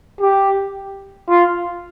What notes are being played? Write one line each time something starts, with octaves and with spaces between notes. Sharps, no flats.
G4
F4